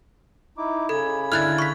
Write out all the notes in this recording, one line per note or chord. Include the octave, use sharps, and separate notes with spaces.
D#4 E4 D6
C#3 A4 B5 G#6
D3 E4 F6 F#6 G#6 A6 F7
C#6 B6